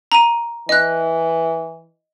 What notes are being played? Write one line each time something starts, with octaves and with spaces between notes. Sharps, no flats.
A#5 D#7
E3 D#5 F#6